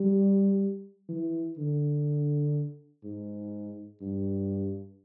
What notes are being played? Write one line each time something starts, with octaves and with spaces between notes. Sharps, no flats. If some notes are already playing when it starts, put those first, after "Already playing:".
Already playing: G3
E3
D3
G#2
G2